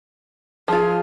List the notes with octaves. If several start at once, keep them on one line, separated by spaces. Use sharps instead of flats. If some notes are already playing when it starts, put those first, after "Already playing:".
F3 F4 G#4